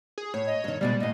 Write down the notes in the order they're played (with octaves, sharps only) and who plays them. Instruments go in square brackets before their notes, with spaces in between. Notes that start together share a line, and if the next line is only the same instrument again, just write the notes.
[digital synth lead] G#4
[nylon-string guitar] A2 [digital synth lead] C#5
[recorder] D#5
[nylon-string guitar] G2 D#3
[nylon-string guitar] D2 B2 G#3 [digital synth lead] G3 [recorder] D5
[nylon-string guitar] D#2 A2 [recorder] D#5